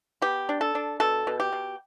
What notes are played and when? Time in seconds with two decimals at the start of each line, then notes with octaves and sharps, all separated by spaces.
0.22 B3 G4
0.49 D4
0.61 A4
0.75 D4
1.00 B2 A4
1.27 B2
1.40 G4
1.53 B2